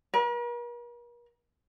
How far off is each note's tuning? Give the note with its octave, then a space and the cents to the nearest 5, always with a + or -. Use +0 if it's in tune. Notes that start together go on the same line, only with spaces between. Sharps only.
A#4 +45